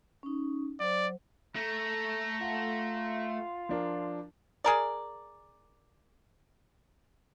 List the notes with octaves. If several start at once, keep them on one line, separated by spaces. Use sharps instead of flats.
C#4 D#4
F#3 C5 D5
A3 A#5
F4 F#5
F3 D4 A#4
G#4 A#4 D5